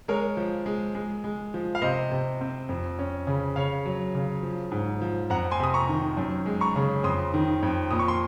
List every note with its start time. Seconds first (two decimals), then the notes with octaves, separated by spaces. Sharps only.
0.08 G#3 A#4 C#5
0.37 F3
0.66 G#3
0.95 G#3
1.24 G#3
1.54 F3
1.75 F5
1.82 C3 C5 D#5
2.11 C3
2.41 C4
2.69 F2
2.99 C#4
3.27 C#3
3.56 C#3 C#5 F5
3.86 F#3
4.14 C#3
4.43 F3
4.72 G#2
5.01 F3
5.30 F2 F#5 A#5
5.51 G#5 C6
5.60 C3 D#6
5.74 A#5 C#6
5.89 D#3
6.17 F#2
6.46 G#3
6.61 A#5 C#6
6.76 C#3
7.04 F2 C6 D#6
7.34 D#3
7.63 F2
7.91 A#2 D#6
7.99 C#6
8.08 C6